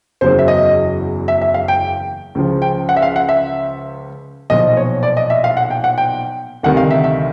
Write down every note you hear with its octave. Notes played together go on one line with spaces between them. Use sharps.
F#1 E2 C#3 F#3 C5
E5
D#5
E5
E5
F5
G5
C#2 C#3 F3
G5
F#5
E5
F5
F#5
E5
B1 A#2 F3 D#5
C#5
D5
D#5
E5
F5
F#5
G5
F#5
G5
D2 C3 D#3 G3 F#5
F5
E5
E5